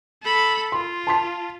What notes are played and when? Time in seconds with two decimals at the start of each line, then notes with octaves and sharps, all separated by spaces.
0.23 A4 B5
0.72 F4 C6
1.07 A5 C6 B6